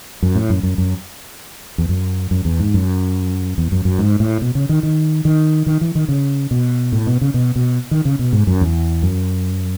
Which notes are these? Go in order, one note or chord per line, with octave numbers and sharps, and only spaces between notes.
F#2
A2
F#2
F#2
F#2
E2
F#2
F#2
E2
G#2
F#2
E2
F#2
F#2
G#2
A2
B2
C#3
D#3
D#3
D#3
D#3
E3
D#3
C#3
B2
A2
B2
C#3
B2
B2
D#3
C#3
B2
G#2
F#2
E2
F#2